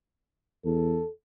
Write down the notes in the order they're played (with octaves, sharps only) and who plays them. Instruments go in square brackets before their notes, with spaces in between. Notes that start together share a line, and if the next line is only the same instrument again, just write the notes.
[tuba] E2 [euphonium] A4